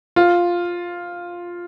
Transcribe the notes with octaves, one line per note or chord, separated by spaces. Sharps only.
F4